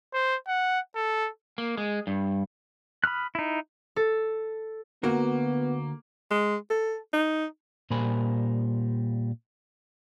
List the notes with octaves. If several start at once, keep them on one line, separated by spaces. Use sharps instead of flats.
C5
F#5
A4
A#3
G#3
G2
B5 D#6 F6 F#6
D#4 E4
A4
D2 A#3 B3 F#4 A#4
G#3
A4
D#4
A#2 G3 A#4 C5 G#5 B5